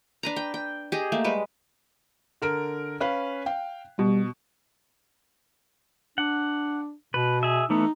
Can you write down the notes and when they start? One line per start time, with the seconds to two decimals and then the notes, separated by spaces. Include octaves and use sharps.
0.23 D4 B4 A#5
0.36 G5
0.54 G5
0.92 G4 G#4 D#5
1.12 A3 A#3
1.24 G3 G#3 B4
2.42 D3 A#4 D7
3.01 C#4 B4 F5
3.46 F5 G5
3.99 B2 G3
6.18 D4 F#5
7.14 B2 B4
7.43 G#4 E5
7.70 E3 A3 B3 D#4